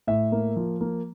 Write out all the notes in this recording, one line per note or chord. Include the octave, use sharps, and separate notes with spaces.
A2 E5
A#3
F3
A#3